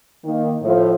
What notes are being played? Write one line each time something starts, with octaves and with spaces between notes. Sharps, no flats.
D#3 A#3
A2 F3